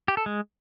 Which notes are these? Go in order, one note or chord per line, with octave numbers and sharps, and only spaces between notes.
G4
A4
G#3